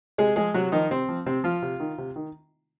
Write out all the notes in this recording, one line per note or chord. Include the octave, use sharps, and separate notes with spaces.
C3 G#3 G#4
F3 G#3 G#4
C3 F#3 F#4
D#3 F3 D#4
C3 C4
F3
C3 C4
F3 F4
C3
D#3
C3
D#3